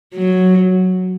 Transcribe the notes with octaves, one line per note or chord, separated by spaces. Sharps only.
F#3